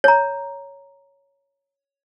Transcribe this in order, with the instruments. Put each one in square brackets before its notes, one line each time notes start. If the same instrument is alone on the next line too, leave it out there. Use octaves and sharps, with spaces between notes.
[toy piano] C#5 A#5